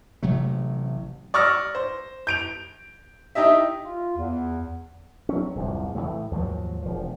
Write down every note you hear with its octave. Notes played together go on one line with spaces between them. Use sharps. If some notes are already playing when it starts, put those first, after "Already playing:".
A1 C3 F#3 A3
D5 C#6 E6 F6 A#6
C5
G6 D7 F7
D#4 E4 G4 D#5 E5
F4
E2
F#3 C4 C#4
D1 C2 F2
A2 C#3 E3 A3
D#2 G#2 F3 F#3
E1 F3